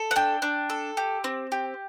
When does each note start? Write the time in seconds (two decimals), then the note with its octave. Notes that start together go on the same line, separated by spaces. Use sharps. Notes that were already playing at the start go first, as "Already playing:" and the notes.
Already playing: A4
0.11 F#5
0.16 D4 G5
0.42 D4
0.70 A4
0.97 G4
1.24 C4
1.52 G4